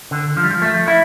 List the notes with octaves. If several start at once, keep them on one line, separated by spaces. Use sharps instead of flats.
D3
F3
G3
F3
A3
E4